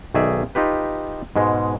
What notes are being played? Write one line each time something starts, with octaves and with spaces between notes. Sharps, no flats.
B1 D#3 G#4 D5 E5
D#4 F4 G4 B4
G#2 B2 G#3